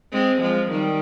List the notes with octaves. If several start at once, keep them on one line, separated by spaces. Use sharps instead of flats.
G#3 C4
F3 G#3
D#3 G3